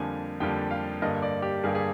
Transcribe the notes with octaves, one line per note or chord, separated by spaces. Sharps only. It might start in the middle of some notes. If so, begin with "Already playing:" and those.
Already playing: F2 D3 G3 A#3 G#5
F2 D3 G3 A#3 G5
F5
G2 D3 G3 A#3 D#5
D5
G4
G2 D3 G3 A#3 G#4
G#4